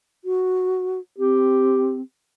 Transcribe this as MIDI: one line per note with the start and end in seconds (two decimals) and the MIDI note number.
0.25 0.99 66
1.18 2.01 60
1.18 1.97 67